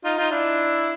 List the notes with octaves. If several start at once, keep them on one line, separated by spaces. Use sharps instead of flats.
D#4 F4
D#4 F4
D4 E4